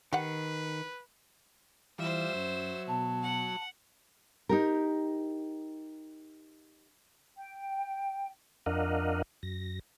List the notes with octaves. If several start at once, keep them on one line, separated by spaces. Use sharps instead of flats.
D#3 G4 B4 F#5
E3 G3 F4 C5 E5
F#2 F#3
B2 A5
F#5
D#4 G4 A#4
G5
F2 D4 A#4 D#5 F5 F#5
F#2 A#6